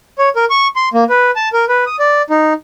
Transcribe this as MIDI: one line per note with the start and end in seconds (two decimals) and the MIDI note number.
0.19 0.29 73
0.36 0.45 70
0.50 0.68 85
0.76 0.89 84
0.94 1.04 58
1.09 1.31 71
1.36 1.49 81
1.53 1.65 70
1.69 1.84 71
1.86 1.96 87
1.99 2.22 74
2.30 2.53 63